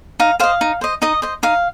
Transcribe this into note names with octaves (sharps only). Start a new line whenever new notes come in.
D#4 F5
C5 D#5 F5
D#4
C5 D#5
D#4 D#5
C5 D#5
D#4 F5